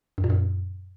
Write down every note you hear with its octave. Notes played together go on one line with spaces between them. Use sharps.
F#2
A#2
F#2